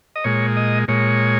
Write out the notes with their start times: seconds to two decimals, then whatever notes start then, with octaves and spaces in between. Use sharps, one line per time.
0.16 D#5
0.24 A#2 G#3 C#5
0.57 D#5
0.88 A#2 G#3 C#5